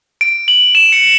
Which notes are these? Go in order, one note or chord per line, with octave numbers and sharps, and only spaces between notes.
D7
F#7
E7
C#7